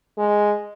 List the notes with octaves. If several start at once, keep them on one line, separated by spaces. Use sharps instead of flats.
G#3